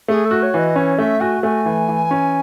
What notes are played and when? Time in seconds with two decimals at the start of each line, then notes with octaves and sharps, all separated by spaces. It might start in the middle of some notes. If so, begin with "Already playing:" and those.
0.08 A3 G#4
0.25 A4
0.31 F#4
0.43 C#5
0.54 E3 D#5
0.76 C#4 C#5
0.98 A3 E5
1.21 F#4 G#5
1.43 A3 G#5
1.66 E3
1.89 E3
2.11 C#4